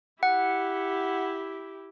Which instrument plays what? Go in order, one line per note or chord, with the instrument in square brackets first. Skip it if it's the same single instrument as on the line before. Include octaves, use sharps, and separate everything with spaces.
[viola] E4 G4 [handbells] F#5